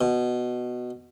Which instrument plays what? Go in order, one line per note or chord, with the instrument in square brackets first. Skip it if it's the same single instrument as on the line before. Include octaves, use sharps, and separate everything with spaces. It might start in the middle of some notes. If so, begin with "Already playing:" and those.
[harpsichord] B2